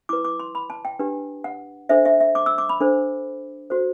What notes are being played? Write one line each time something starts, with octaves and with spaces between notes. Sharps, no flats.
E4 B4 D6
D6
C6
B5
A5
G5
D4 G4 B4
F#5
D4 A4 C5 E5
E5
E5
D6
E6
D6
B5
D4 A4 C5
F#4 A4 C5